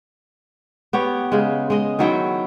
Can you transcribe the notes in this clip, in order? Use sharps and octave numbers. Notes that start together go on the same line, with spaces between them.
B3 G4 C#5
C#3 G#3
G#3 D#5
D#3 F#3 E4 G5